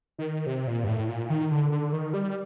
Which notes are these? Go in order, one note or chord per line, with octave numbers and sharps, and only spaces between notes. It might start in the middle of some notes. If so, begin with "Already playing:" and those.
D#3
C3
A#2
G2
A2
A#2
D#3
D3
D3
D#3
G3